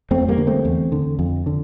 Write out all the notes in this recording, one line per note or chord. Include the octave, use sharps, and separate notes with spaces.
F2 A3 C4
G3 A#3
D3
A3 C4
E2
D3
F2
D3